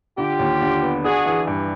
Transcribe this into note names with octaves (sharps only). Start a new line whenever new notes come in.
D3 F4 G4
D#2
D3
B3
D4 F#4 G#4
E3
G2